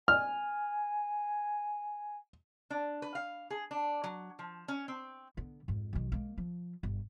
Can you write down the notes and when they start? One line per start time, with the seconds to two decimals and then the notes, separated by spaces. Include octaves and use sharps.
0.08 G#5 F6
2.70 D4
3.02 B4
3.15 F5
3.50 G#4
3.71 D4
4.04 F#3
4.39 F3
4.68 C#4
4.88 C4
5.37 D3 B3
5.68 F2 G#2
5.93 B1 D#3
6.12 G#3 A#3
6.38 F3
6.83 G1